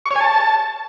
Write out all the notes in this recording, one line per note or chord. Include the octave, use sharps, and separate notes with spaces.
C#6
C#5
G#5
A5